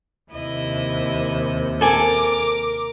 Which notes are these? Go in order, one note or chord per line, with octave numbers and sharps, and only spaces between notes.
D#2 C3 E4 D#5
A4 A#4 G#5 D6